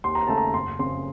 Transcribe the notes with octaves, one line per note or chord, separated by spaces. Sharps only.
D#2 C6
A#5
C#3 A3 A5
A#5
F#1 C6
F2 C#3 C6